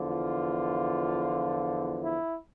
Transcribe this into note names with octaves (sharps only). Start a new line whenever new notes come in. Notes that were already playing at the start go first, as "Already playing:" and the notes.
Already playing: E2 D3 F3
F4
E4